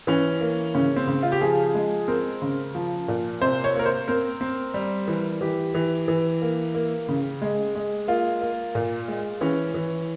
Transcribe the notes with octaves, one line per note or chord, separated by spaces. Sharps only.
E3 C#4
A#3
C#3 C#4
C4
C#3
F4
G4
F3 G#4
G#3
C4 A#4
C#3
F3
A#2
C3 C5
C#5
A#3 A#4
C5
C4 A#4
C4
G3
E3
E3 G4
E3
E3
A#3
A#3
C#3
G#3
G#3
A#3 F4
A#3
A#2
G#3
E3 C#4
E3